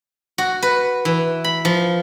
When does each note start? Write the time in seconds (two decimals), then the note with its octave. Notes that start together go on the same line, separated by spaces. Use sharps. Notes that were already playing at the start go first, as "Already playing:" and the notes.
0.38 F#4
0.62 B4
1.05 E3
1.44 B5
1.65 F3